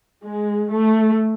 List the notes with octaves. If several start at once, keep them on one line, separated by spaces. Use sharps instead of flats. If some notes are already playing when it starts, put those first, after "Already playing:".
G#3
A3